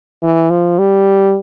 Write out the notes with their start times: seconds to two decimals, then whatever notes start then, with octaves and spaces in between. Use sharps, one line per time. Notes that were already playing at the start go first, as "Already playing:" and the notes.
0.23 E3
0.50 F3
0.79 G3